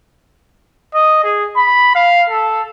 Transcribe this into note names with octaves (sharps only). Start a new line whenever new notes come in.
D#5
G#4
B5
F5
A4